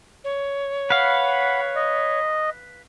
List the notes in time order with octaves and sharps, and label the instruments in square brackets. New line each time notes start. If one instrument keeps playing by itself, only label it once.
[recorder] C#5
[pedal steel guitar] B4 F5 [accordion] F#5 B5
[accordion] D#5